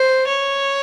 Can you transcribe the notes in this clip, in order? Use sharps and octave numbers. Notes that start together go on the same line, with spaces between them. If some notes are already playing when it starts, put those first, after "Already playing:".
Already playing: C5
C#5